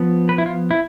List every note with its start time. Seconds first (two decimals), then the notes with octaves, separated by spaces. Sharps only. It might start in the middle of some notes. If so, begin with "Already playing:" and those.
Already playing: F3 B3
0.29 B4
0.38 E4
0.46 F4
0.71 E4